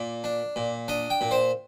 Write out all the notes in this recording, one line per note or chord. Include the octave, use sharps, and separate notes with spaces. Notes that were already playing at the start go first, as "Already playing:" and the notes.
Already playing: A#2 D5
D4
A#2
D4 D#5
G5
A#2
C5